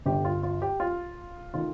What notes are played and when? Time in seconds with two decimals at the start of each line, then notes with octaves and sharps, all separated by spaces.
0.06 G1 G2 D3 G4
0.25 F4
0.43 F4
0.62 G4
0.80 F4
1.54 D#3 A3 F4